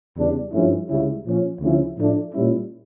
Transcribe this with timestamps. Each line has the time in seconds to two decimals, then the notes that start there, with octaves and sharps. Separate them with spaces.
0.16 E2 C#3 G3 D4
0.52 G2 F3 A3 C#4 E4
0.88 C#2 C#3 G3 C#4 E4
1.25 A#2 F3 C#4
1.60 D2 C#3 F3 C#4 E4
1.97 A2 F3 A3 D4
2.32 A#2 G3 C#4 E4